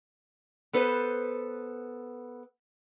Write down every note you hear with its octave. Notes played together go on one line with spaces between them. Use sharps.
B3 A4 B4 C5